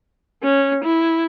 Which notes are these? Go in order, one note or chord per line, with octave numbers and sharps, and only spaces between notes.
C#4
E4